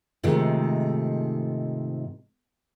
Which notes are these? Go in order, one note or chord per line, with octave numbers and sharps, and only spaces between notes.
G#2 C3 D#3 F3 G#3 A3